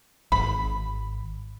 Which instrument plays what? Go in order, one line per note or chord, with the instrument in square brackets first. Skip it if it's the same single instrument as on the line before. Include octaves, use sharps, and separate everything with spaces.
[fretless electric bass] G#1 [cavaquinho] B5